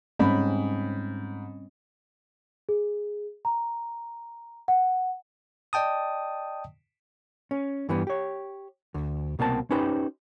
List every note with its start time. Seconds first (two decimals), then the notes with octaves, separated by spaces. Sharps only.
0.20 G#2 G3 C4 C#4 B5
2.69 G#4
3.45 A#5
4.68 F#5
5.73 D5 D#5 G5 A5 D#6
7.51 C#4
7.89 G2 E3 G3 B3
8.07 G4 C#5
8.94 D2
9.39 C2 B2 A#3 C4 A5
9.71 C#4 D#4 G4 B4 C5